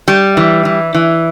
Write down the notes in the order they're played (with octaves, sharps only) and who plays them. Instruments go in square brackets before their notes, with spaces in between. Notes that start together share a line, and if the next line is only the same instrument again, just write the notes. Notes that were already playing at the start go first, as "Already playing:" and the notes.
[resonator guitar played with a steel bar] G3
E3
E3
E3